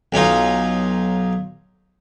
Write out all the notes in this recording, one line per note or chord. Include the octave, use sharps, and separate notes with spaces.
B1 C#4 D#4 F4